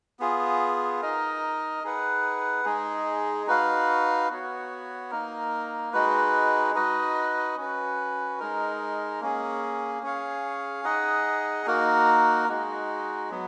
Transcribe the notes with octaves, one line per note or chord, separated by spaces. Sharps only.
B3 F4 G#4
D#4 A#4 D#5
D#4 G#4 B4 F#5
G#3 D#4 G#4
D#4 F#4 B4 F5
B3 F#4 C#5
A#3 D#4 A#4
G#3 D#4 F#4 B4
D#4 F#4 B4 D#5
C#4 F#4 B4
G#3 D#4 A#4
A#3 C#4 G#4
C#4 G#4 C#5 F5
D#4 G#4 D#5 F#5
A#3 D#4 F#4 A#4
G#3 D#4 F#4
F#3 B3